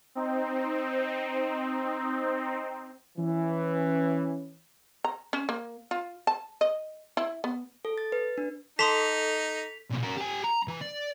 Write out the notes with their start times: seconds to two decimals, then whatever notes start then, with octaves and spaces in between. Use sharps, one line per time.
0.15 C4 D#4
3.18 E3 C#4
5.04 A#5
5.33 C#4
5.49 A#3
5.91 F4
6.27 A5
6.61 D#5
7.17 E4
7.44 B3
7.85 A4
7.98 A6
8.12 B4
8.38 D4
8.79 D#4 A4 A5 C6 D#6 B6 F7
9.91 B1 A#2
10.03 F#4 A#4
10.18 G4 G#5
10.44 A#5
10.68 E3
10.81 D5